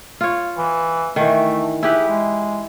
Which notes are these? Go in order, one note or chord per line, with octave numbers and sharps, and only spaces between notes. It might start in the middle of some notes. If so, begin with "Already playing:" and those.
F4 C#5
E3
D#3 E3 A3
E4 G4 G#4 B4
G#3